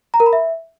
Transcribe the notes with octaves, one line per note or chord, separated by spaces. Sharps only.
A#5
A#4
B5
E5